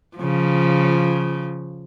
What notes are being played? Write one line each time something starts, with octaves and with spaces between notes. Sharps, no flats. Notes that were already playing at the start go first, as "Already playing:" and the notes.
C#3 F3